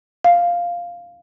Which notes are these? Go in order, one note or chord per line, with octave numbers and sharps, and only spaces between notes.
F5